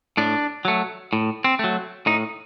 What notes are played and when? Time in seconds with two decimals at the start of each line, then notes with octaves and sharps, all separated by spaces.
0.17 A2 D4
0.65 F#3 A3
1.13 A2
1.44 C4
1.59 F#3 A3
2.06 A2 D#4